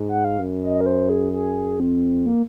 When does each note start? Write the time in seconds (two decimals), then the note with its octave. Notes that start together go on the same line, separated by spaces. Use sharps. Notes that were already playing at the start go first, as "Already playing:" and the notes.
Already playing: G#2
0.09 F#5
0.25 F5
0.39 F#2
0.63 D#5
0.81 A#4
0.86 C5
1.09 G#4
1.33 G#4
1.80 F2 C4
2.26 A#3